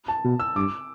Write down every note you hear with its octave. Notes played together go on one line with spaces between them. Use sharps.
A5
B2
E6
G2 D6